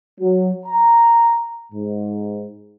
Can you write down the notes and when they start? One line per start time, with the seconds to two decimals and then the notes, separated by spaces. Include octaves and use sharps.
0.21 F#3
0.66 A#5
1.73 G#2